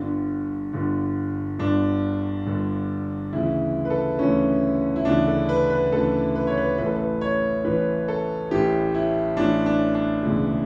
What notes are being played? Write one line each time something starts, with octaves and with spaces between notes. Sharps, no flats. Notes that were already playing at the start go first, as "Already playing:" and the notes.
Already playing: G1 G2 D3
G1 G2 D3
G1 G2 D3 D4
G1 G2 D3
D2 C#3 E3 E4
B4
A4
D2 C#3 E3 C#4
E4
D2 C#3 E3 D4
A4
B4
B4
D2 C#3 E3 A4
B4
C#5
B4
A1 A2 E3 B4
A4
B4
C#5
A1 A2 E3 B4
A4
A1 A2 E3 G4
E4
A1 A2 E3 D4
D4
D4
E1 D2 C#3 E3